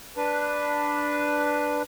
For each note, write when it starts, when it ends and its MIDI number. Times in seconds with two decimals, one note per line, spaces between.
0.17 1.82 62
0.17 1.82 71